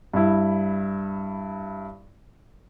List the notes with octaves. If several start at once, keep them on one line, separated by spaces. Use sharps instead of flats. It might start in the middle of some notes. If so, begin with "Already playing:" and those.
G2 E4